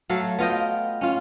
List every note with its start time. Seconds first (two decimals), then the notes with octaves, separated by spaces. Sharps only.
0.09 F#3 A3 A4 F5
0.39 B3 F4 D#5 G5
1.01 C#4 F4